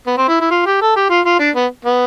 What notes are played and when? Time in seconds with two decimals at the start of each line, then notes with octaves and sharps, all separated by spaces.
0.07 B3
0.17 C4
0.28 E4
0.41 E4
0.51 F4
0.66 G4
0.81 A4
0.96 G4
1.10 F4
1.25 F4
1.39 D4
1.55 B3
1.85 B3